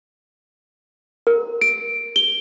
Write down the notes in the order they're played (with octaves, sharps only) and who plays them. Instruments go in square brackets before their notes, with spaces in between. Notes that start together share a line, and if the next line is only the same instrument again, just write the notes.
[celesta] A#4
D7
G7